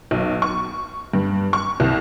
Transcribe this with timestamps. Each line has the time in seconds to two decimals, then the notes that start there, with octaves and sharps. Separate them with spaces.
0.11 B1
0.42 C#6
1.14 G2
1.53 C#6
1.80 C2